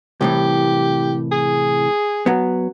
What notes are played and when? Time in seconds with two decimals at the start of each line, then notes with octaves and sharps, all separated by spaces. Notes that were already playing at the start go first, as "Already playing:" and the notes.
0.21 C2 A2 E3 G4
1.32 G#4
2.26 F#3 B3